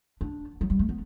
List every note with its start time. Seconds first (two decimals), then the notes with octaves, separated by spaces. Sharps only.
0.21 D4
0.61 F#3
0.70 G3
0.79 A3
0.89 B3